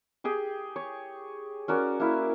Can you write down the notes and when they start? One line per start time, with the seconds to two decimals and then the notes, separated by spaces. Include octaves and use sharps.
0.24 G4 G#4 G5
0.76 C#5
1.68 C#4 F#4 A#4 D5
2.00 A#3 E4